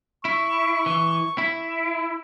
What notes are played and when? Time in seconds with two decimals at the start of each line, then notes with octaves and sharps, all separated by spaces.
0.25 E4 C#6
0.86 E3
1.38 E4